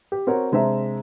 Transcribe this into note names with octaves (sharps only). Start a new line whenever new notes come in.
G4
C4 F#4 A#4 C#5
C3 G#3 D4 C5 E5 A#5